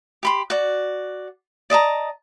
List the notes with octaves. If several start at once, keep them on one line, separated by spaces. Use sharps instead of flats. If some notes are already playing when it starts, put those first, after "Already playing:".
G4 B5 C6
F#4 D5
D5 D#5 A5 A#5